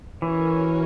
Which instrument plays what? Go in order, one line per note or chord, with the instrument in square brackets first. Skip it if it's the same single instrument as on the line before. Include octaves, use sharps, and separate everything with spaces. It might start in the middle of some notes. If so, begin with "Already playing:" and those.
[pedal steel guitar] E3 [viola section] C#4 F#4 A#4 C#5